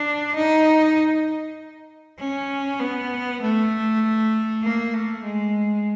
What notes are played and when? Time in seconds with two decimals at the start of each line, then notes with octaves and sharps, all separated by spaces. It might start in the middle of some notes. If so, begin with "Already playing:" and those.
Already playing: D4
0.36 D#4
2.20 C#4
2.80 B3
3.41 A3
4.63 A#3
4.93 A3
5.24 G#3